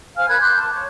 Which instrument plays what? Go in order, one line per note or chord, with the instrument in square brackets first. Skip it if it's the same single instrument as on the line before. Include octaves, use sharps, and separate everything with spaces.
[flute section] C5 F5 G#5 F6
A#4 B5 F#6 G#6
C6 D6 F#6 G6
A5
C#5